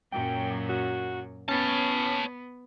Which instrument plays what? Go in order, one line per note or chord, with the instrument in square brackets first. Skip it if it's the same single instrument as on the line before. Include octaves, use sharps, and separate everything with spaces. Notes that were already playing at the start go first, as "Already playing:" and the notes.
[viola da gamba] F#2 A#2 F#3 [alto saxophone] G5
[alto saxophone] F#4
[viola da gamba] B3 [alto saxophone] C#4 [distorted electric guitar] C#5 A5